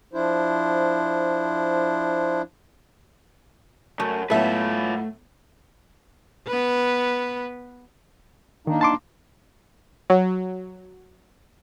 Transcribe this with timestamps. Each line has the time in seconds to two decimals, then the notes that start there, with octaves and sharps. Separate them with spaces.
0.13 F3 D4 E4 C5
4.00 F#2 A3
4.30 A2 F#3 A3 B3 F4 A4 B4 E5
6.48 B3 B4
8.67 D#3 A#3 D4 D#4
8.81 A5 C6 D6
10.10 F#3